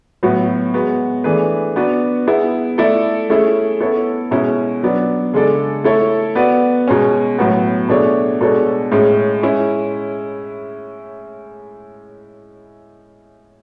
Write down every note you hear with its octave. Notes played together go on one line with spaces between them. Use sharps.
A2 F#3 B3 F#4
G#3 B3 F#4
E3 A3 D4 G#4 B4
B3 D4 F#4 B4
B3 E4 G#4
A3 E4 A4 D5
A3 C#4 E4 G#4
B3 E4 A4 C#5
B2 G#3 C#4 E4
F#3 B3 D4
C#3 G#3 D4 A4 D5
A3 E4 A4 C#5
B3 F#4 B4 D5
B2 G#3 C#4
A2 F#3 B3 F#4
B2 A3 D4 G#4 C#5
B2 G#3 D4 A4 C#5
A2 G#3 C#4 G#4
G#3 C#4 E4